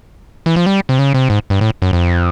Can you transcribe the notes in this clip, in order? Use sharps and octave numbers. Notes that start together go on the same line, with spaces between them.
E3
F3
G3
C3
C#3
C3
G#2
G2
A2
F#2
F2